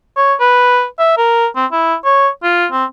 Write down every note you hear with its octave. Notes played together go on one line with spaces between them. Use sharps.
C#5
B4
E5
A#4
C4
E4
C#5
F4
C4